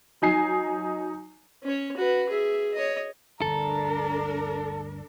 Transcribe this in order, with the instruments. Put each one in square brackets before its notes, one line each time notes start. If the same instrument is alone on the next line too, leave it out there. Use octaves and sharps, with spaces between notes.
[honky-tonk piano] F#3 D#4 G#5 C7
[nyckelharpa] C#4 C#5
F#4 B4
G#4 E5
C#5 D#5
[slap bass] G1 D2 [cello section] D4 A#4 [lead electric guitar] A4 [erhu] A#5